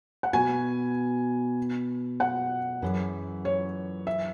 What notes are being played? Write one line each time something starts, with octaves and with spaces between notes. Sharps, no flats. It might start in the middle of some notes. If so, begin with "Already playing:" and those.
F#5
B2 B3 F#4 G#5
F#5
F#2 E3 C#4 G#4
C#5
E5